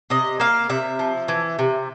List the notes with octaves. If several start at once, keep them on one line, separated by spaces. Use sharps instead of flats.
C3 D#5
A#3 F5
C3 E5
F3
E3
C3